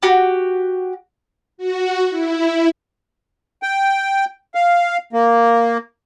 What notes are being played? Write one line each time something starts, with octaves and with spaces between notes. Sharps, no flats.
F#4 G4
F#4
E4
G5
F5
A#3